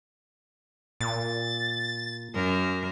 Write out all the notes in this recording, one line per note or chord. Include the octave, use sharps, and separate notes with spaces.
A#2 A6
F#2 A#4